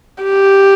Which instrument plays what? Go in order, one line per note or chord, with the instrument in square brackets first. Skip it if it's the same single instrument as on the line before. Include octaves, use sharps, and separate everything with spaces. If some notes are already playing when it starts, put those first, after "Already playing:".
[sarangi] G4